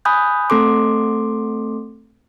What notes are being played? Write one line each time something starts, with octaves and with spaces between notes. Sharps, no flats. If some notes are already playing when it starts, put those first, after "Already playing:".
G#5 B5 D#6 F#6 G6
A3 C4 A4 C6 D6